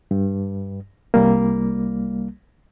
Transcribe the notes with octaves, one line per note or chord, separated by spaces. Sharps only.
G2
C2 G3 A#3